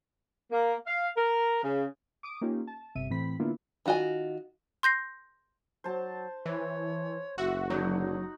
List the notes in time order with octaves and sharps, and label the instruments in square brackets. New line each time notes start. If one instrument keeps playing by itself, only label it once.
[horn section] A#3
F5
A#4
C#3
[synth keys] D6 D#6 D7
A#3 C#4 D#4 F4 G4
A5
G1 C3 E5 D#7
A2 E3 C4 B5 B6
D3 A#3 B3 D4 E4 F4
[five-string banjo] D#3 F4 F#4 D#5 G#5
[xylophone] C6 G6 A#6 C7
[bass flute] F#3 [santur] C5 A5
[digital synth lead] E3 [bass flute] C#5
[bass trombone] F#1 [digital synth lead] F#4 [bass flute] E5 [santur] E6
[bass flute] D3 [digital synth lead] F#3 [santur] D#4 F#4